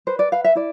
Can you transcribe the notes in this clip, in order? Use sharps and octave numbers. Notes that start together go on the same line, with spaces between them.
B4 C5
D5
B4 F5
E5
E4 D5